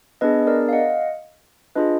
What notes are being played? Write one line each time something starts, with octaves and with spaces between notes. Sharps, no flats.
B3 D4 G#4 B4 D#5
A#4 D5
F5
D#5 F#5
D4 F4 G#4 B4 D#5